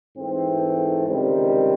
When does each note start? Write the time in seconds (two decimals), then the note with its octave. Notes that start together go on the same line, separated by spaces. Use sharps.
0.16 G#2 E3 A3 C4
1.06 C#2 C3 D#3 G3 C4